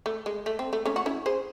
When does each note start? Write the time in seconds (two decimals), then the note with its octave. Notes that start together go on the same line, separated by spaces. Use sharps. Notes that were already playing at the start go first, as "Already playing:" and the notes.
0.06 A3
0.26 G#3
0.46 A3
0.59 C4
0.73 A3
0.86 A3 C#4
0.96 F#4
1.06 C#4 E4
1.26 G#4 C5